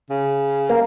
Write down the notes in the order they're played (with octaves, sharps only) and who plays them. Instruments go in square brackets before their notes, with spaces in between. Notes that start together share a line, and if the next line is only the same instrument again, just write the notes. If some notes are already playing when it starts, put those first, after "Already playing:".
[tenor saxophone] C#3
[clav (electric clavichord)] A#3